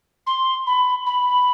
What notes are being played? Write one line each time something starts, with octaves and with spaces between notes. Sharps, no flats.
C6
B5
B5